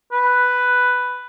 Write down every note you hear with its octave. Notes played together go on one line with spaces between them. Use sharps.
B4